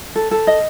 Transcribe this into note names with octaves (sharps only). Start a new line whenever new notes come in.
A4
A4
D#5